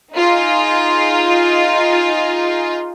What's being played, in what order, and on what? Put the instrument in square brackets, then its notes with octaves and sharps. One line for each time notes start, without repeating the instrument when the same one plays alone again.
[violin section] D#4 F4 G#4